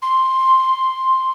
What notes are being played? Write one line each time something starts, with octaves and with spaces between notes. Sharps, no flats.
C6